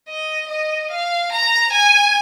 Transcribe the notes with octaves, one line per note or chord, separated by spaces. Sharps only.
D#5
D#5
F5
A#5
G#5